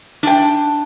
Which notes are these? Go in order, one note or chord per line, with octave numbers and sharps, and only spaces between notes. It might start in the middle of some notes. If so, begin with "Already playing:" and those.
D4 G5